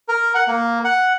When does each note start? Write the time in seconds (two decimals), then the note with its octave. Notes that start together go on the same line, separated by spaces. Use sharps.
0.09 A#4
0.35 F#5
0.48 A#3
0.84 F#5